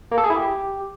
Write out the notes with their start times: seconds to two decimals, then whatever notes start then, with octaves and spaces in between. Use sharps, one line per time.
0.12 A#3
0.18 A4
0.24 G#4
0.30 E4
0.36 G4